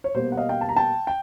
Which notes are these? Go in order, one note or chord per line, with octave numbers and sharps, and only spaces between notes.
C#5
B2 G3 A#3 C5
F#5
D#5 F5
F5 G5
A5
A#5
G5 A5
G5